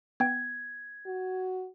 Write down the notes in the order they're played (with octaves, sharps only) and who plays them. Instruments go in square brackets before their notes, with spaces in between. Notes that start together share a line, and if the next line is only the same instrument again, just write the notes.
[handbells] B3 G5 [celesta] G#6
[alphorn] F#4